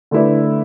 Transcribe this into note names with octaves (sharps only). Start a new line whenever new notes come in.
D3 A3 E4 B4 D5